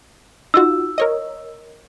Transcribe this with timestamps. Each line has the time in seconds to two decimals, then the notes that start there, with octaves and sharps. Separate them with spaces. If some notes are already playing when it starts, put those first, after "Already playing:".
0.54 D#4 F4 F#4 E6
0.98 A#4 C#5 D#5